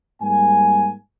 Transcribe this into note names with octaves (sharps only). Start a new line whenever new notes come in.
G#2 G3 A#3 G#5